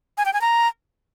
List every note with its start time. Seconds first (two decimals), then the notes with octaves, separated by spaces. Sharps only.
0.18 G#5
0.26 G5
0.33 G#5
0.41 A#5